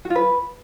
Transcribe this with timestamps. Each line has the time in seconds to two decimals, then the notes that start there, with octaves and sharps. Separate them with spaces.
0.05 F#4
0.10 F4
0.15 B4